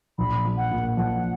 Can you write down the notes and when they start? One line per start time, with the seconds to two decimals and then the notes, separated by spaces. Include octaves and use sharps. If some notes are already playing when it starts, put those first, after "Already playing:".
0.18 A#1 B5
0.45 F3
0.57 F#5
0.71 A#2
0.97 F3 F#5